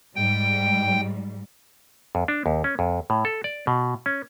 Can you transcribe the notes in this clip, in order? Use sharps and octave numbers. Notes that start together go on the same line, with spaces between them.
G#2 G3 G5
F2
D4
D#2
C#4
F2
A2
A4
D5
B2
C#4